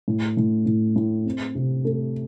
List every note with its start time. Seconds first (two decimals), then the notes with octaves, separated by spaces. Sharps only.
0.08 A2
0.37 A2
0.66 A2
0.96 A2
1.25 C4
1.55 C3
1.85 A3